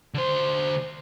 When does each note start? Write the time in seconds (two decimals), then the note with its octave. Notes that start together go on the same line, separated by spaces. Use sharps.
0.14 D3 C5